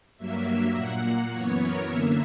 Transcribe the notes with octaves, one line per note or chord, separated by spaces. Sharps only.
G2 F#3 A#3 E5
E5
A#2 A#3 F#5
F#2 E3 B3 C#5
A#4
F#2 D3 A#3 E5